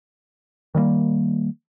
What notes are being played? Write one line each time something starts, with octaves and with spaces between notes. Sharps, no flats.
D#3 G3 G#3 A#3